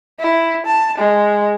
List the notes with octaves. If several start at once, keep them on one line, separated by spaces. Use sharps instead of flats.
E4
A5
G#3